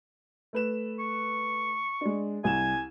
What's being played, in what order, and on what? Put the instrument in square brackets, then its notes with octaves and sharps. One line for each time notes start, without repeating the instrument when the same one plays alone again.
[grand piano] A3 B4 E7
[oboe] C#6
[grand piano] G#3 D4
[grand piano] C2 E7 [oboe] G#5